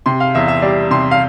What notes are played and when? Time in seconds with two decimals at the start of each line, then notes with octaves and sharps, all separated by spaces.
0.06 C3 C6
0.20 F5
0.35 E2 E5
0.48 E5
0.62 G3 D5
0.91 C3 C6
1.11 F5